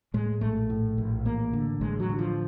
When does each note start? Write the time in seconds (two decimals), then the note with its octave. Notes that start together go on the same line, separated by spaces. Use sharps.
0.14 A2 G#3
0.41 A#1 A3
0.70 A2
0.98 A#1
1.25 A1 A#3
1.53 D3
1.81 A1 G#3
2.00 F#3
2.09 D3
2.19 F3